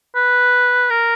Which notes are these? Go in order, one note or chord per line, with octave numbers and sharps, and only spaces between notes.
B4
A#4